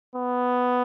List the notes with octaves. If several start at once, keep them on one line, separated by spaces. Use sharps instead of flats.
B3